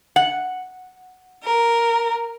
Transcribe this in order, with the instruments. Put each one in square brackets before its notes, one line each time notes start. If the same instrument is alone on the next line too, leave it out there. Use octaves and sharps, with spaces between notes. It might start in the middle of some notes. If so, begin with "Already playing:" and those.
[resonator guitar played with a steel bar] F#5
[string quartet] A#4